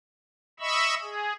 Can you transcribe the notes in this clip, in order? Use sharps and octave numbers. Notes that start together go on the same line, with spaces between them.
D#5 E5 B5 C#6 E6
G#4